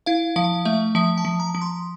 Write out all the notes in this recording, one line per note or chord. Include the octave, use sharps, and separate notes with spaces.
E4 F5
F3 F5
A3 E5
F3 E5
A5
F3
A#5
F3
C6